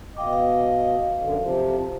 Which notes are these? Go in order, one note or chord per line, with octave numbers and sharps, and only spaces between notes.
B2 D#5 F5 G5 D6
F5
F#2 D3
C3 F3